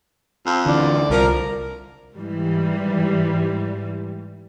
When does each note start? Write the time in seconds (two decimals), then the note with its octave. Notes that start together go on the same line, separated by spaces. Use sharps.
0.46 F2
0.66 D2 D3 E3 D5
1.10 C2 F3 A#4
2.15 G#2 E3 G3